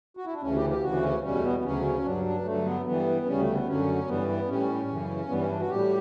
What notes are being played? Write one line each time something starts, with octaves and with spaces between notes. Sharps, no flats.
F#4
E4
D4
D2 C#3 E3 C#4
G4
G4
D2 C#3 E3 F#4
C#4
E2 B2 G3 C#4
A3
B3
B3
D2 C#3 F#3 C#4
G2 F#3 D4
D4
G2 D3 F#3 A3
B3
G2 E3 G3 B3
D2 C#3 G3 C#4
A3
B3
F#2 D3 F#3 C#4
G2 E3 G3 B3
B3
A2 G3 C#4
F#2 C#3 E3
G2 E3 G3 B3
C#4
D4
F#4
A2 G3 G4